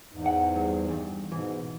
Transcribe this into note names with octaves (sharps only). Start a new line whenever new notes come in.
E2 G#2
F#5
G2
E2 G2
G#2 B2 E3